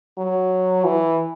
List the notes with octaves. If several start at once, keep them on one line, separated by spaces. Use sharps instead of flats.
F#3
E3